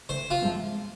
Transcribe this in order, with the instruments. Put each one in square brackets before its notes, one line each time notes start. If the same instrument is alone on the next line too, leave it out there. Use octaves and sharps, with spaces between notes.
[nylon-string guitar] D2 [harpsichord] C5
[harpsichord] F4
[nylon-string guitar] C3 F3 G#3 C4